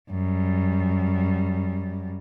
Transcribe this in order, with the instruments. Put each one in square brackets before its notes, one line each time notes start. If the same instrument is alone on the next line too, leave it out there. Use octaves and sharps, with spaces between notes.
[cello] F#2 G3